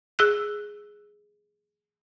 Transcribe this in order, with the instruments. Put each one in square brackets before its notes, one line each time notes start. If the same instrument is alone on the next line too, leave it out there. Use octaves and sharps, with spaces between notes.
[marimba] G#4 E6 F#6